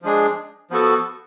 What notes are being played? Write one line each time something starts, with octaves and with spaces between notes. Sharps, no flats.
F3 G#3 D4 G#4
F3 B3 F#4 A4